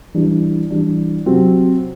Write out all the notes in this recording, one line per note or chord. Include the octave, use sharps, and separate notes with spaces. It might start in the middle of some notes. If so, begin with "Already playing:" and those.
E3 G3 D4
E3 G3 D4
C3 F#3 C4